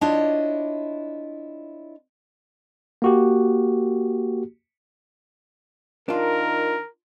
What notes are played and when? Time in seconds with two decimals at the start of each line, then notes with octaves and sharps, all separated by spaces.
0.01 D4 E4 F4 C#5 D#5
3.02 A#3 F#4 G4
6.09 D#3 D4 F4 A#4